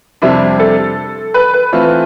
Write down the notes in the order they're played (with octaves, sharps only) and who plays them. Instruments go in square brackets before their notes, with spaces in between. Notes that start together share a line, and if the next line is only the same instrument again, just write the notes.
[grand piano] F2 C3 G3 D4 [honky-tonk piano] E4
[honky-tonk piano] A4
B4
B4
[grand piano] E3 A3 C4 F4